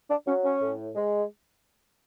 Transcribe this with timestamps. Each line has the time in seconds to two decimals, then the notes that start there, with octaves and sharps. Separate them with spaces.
0.10 D4
0.27 F#3 C#4
0.44 C#4
0.61 A2
0.95 G#3